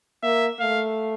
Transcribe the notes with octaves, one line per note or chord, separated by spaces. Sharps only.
A#3 E5
A3 F5